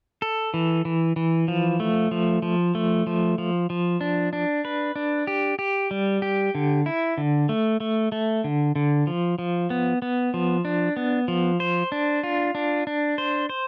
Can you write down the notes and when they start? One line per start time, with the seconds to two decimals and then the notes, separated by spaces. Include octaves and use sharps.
0.22 A4
0.54 E3
0.85 E3
1.16 E3
1.48 F3
1.80 A3
2.11 F3
2.42 F3
2.75 A3
3.07 F3
3.38 F3
3.70 F3
4.01 D4
4.33 D4
4.65 B4
4.96 D4
5.27 G4
5.59 G4
5.91 G3
6.22 G4
6.55 D3
6.86 E4
7.18 D3
7.49 A3
7.80 A3
8.12 A3
8.44 D3
8.76 D3
9.07 F3
9.39 F3
9.70 B3
10.02 B3
10.34 F3
10.65 D4
10.97 B3
11.28 F3
11.60 C5
11.92 D4
12.23 F4
12.55 D4
12.87 D4
13.18 C5
13.49 C5